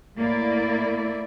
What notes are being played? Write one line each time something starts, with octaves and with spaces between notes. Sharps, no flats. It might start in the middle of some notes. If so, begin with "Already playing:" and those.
A2 A#3 E4 D5